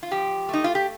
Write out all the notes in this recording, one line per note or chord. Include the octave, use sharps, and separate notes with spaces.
F4
F3 G4
A3 D#4
F4
G4